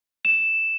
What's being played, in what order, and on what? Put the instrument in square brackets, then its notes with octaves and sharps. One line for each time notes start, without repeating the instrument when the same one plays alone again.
[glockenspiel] E7